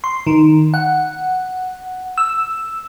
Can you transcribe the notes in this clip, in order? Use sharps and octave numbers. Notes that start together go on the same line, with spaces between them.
C6
D#3
F#5
E6